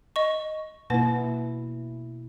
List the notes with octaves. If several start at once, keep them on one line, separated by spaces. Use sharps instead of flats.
D#5 C#6
B2 A#3 E4 B4 F#5